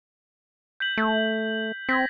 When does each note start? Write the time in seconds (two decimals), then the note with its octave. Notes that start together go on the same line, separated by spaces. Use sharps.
0.80 G6 B6 F#7
0.98 A3
1.89 C4 G#6 A#6 B6